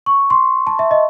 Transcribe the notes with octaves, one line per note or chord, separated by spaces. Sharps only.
C#6
C6
A5
E5
D#5